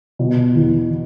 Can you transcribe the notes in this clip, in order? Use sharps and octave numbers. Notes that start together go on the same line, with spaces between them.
B2
E2